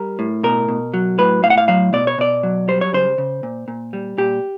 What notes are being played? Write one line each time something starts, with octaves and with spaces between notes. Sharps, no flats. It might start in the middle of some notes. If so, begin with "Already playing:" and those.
Already playing: G3 A#4
A2
B2 A#4
B2
F#3
A2 B4
A2 F5
F#5
F5
F#3 F5
B2 D5
C#5
B2 D5
F#3
G3 C5
C#5
C#3 C5
C#3
A#2
A#2
G3
A#2 G4